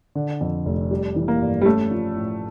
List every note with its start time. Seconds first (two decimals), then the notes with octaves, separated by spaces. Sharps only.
0.15 D3
0.41 F2
0.65 F1
0.91 G3
1.16 E3
1.28 A#3
1.41 G2
1.61 G3
1.66 A3 C#4
1.91 F3
2.16 A2